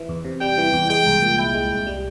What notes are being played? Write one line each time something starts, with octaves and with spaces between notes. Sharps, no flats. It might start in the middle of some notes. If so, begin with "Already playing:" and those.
Already playing: E3
E2
C3
G3 G5
E3
E2
G#3 G5
C2
A#2
E4 G5
G#3
C2
G3